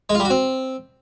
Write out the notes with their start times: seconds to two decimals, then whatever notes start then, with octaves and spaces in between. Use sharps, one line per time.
0.10 G#3
0.15 F4
0.20 G3
0.25 F#4
0.30 C4